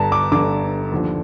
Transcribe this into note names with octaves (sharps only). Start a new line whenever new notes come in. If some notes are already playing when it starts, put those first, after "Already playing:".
Already playing: G1 G2 D3 A5 A#5
D6
G1 G2 D3 D6
D#2 D3 F3